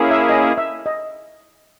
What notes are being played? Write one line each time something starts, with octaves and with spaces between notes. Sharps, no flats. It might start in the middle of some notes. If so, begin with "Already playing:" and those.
Already playing: A#3 C#4 E4 G#4
E5
D#5
E5
D#5